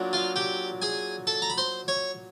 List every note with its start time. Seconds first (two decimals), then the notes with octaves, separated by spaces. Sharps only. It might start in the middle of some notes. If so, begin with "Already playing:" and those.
Already playing: A#2 F#3 D4
0.13 F4 F5
0.36 G4 G5
0.82 G#4 G#5
1.27 A4 A5
1.42 A#5
1.50 B5
1.58 C5 C6
1.88 C#5 C#6